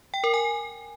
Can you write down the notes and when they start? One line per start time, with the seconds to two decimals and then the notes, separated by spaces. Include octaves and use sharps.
0.14 G5
0.24 A#4
0.34 G#5